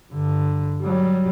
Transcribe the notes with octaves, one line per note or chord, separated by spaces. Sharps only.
G2 D3
F#3 G3